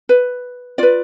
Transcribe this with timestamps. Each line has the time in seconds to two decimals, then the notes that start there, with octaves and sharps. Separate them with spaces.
0.09 B4
0.78 F4 B4 D5